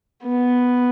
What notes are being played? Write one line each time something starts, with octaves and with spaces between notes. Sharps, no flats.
B3